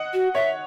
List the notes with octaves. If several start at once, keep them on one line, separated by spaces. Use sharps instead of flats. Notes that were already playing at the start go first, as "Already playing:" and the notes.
Already playing: D#5 F#5
F#4
C#5 E5